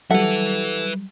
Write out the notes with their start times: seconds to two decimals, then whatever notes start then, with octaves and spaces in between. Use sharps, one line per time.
0.11 F#3 G3 A4 B4 E5 F#5